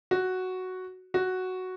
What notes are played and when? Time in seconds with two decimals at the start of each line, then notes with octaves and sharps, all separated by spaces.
0.11 F#4
1.14 F#4